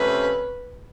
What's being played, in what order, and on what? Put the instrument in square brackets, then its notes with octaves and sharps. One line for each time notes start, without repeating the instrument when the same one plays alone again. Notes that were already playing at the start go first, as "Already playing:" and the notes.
Already playing: [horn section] C3 F3 A3 C#4 [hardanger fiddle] B4